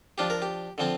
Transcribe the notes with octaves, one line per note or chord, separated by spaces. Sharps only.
F3 D4 F4 G4
A#4
G4
D3 F3 C4 F4